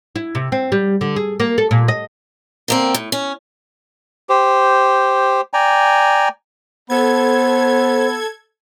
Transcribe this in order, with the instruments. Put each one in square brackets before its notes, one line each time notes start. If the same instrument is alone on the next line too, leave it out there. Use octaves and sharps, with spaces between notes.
[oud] E4
C3
C4
G3
D3
G#4
A#3
A4
A#2
D#5
[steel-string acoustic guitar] D3 A#3 C4
A2
C#4
[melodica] G4 C5
D5 G5 G#5 A#5
[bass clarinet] B3 [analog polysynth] A4 G#6 [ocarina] C5